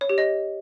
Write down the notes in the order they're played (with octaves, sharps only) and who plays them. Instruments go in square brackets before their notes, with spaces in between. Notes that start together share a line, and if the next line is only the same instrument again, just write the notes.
[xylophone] C#5
G4
D#5